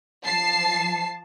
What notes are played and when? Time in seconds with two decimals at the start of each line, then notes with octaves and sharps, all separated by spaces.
0.24 F3 A5 C7